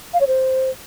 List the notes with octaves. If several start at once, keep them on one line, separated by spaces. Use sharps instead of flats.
F5
C#5
C5